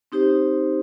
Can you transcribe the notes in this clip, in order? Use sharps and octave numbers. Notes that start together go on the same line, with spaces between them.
C4 D#4 G4 C5